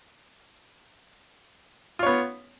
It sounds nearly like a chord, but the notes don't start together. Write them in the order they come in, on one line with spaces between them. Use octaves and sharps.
F4 C#5 B3